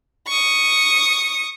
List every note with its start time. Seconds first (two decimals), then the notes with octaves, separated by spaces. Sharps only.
0.28 C#6 D#6